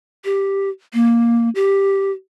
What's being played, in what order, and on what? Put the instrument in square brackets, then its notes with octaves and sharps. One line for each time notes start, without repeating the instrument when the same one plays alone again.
[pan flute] G4
A#3
G4